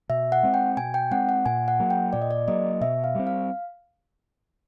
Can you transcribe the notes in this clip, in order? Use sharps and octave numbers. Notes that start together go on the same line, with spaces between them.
B2 E5
F#5
G#3 C4
G5
B2 G#5
G5
G#3 C4 F#5
F#5
A#2 G#5
F#5
F#3 A#3
G5
A#2 D5
D#5
D5
F#3 A#3 D#5
B2 E5
F5
G3 C4
F5